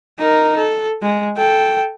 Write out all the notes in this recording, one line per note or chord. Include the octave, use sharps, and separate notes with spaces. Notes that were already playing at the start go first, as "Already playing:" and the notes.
D#4 A#4
A4
G#3
A4 G5